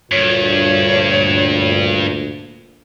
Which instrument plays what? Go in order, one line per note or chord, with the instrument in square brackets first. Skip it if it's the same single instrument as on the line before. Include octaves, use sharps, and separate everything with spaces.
[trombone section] D2 A#2 [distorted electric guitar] G2 [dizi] C#5